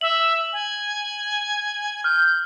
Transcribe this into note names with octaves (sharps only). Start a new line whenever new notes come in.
E5 F#7
G#5
F6 G6